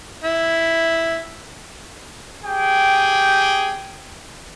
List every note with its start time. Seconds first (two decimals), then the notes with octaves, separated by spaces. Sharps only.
0.24 E4
2.45 G4 G#4 G5